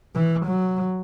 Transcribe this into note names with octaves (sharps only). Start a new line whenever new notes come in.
E3
F#3